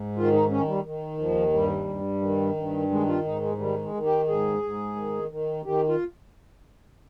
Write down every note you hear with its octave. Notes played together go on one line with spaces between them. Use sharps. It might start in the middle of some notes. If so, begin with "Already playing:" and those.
Already playing: G#2
D#3 F4
D#4
D#3 C#4
G3
D#3
D#2 F3
G2 G3
G2
D#3
G2
D#3 G#3
F4
G#2 D#4
G#3
D#3 G3
G#3
D#3
G4
G#2 G#4
G#2
D#3
D#3
D#3 G4
F4